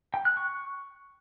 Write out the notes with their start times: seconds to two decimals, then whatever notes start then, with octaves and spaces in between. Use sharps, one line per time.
0.14 G5
0.25 F#6
0.37 C#6